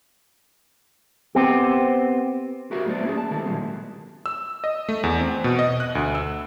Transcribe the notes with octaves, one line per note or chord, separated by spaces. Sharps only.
B3 C4 G4
F#4 G4 A#4 E5 F5
F#3 A3 B3 C5 D5
A#3 C#4 F4 G4 G#4
A5
D#3 G#3 E4 G4 A4
A#2 F3 F#3 G#3 A#3 C4
E6
D#5
A3
E2
C4
B2
D#5
F#6
D2
E6